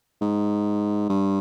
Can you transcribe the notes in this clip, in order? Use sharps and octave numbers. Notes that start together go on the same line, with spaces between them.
G#2
G2